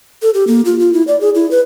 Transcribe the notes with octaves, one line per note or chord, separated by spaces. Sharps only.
A4
G4
A#3
F4
F4
E4
D5
G#4
E4
B4